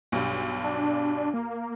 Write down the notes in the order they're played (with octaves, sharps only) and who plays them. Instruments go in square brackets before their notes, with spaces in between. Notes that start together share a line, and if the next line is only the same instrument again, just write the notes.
[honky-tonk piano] B1 G2
[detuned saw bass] D4
A#3